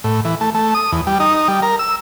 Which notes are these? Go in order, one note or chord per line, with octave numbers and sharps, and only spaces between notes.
A2
E3
A3
A3
D#6
E2
G3
D#4
G3
A#4
E6